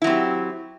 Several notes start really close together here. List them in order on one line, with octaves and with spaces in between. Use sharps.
E4 F#3 C4 G4